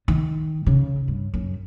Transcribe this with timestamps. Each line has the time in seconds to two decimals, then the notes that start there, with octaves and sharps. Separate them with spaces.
0.08 D#3
0.66 C#3
1.08 G2
1.34 F#2